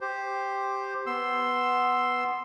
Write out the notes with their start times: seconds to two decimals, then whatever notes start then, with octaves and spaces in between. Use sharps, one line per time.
0.01 G4 C5
1.06 B3 C6 E6